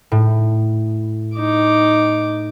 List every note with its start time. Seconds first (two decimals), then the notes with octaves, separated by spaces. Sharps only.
0.12 A2
1.37 D#4 D6